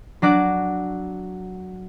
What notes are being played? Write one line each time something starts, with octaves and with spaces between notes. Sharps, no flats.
F#3 D4 F#4 D6